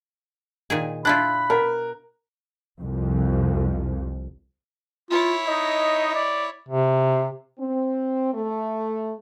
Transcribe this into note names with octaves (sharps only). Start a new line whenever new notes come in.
A#2 D#3 G#4
D4 E4 F4 B5 F#6
B2 A#4
C2 F2 F3
E4 F4 C#5
D#4 D#5
D5
C3
C4
A3